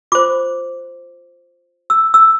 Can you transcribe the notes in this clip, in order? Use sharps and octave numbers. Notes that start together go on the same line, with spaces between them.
F4 C5 D6
E6
E6